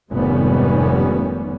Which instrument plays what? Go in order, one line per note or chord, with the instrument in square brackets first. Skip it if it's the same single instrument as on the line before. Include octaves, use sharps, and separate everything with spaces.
[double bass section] F1 G#2 D#3 G3 B3 C#4